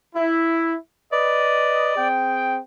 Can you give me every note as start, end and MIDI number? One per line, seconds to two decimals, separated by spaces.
0.15 0.74 64
1.12 1.92 71
1.12 2.08 74
1.12 1.92 75
1.96 2.59 60
1.96 2.59 68
1.96 2.59 79